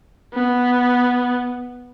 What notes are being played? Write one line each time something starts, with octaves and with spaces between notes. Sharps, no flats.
B3